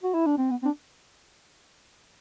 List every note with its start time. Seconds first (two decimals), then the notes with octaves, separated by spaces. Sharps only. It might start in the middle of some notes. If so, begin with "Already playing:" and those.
0.03 F#4
0.14 E4
0.26 D4
0.38 C4
0.50 B3
0.62 C4
0.66 D4